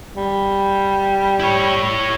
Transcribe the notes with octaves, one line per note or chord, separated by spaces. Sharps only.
G3
E4 C#5